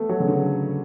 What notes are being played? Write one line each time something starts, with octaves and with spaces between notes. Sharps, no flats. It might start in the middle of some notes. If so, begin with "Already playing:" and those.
Already playing: A3 B3
F#3
C#3
D3